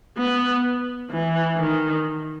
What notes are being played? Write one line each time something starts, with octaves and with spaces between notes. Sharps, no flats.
B3
E3
D#3